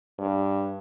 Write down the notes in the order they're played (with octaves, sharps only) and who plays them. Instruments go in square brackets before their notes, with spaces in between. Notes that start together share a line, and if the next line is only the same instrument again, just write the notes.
[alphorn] G2